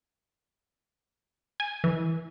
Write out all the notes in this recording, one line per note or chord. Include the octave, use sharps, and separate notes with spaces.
G#5
E3